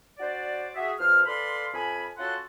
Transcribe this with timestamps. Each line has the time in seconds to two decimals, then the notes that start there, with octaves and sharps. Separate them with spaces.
0.19 D4 F#4 C5 D5
0.76 F#4 G#4 E5
0.99 E2 F3 C5 F6
1.26 A4 B4 D5 F5 B5 C6
1.74 F2 G#5 B5
2.18 C#4 F4 F#4 A4 F#5 C6